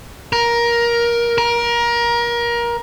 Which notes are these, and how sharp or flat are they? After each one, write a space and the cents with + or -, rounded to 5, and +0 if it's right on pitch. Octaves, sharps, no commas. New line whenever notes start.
A#4 +15
A#4 +25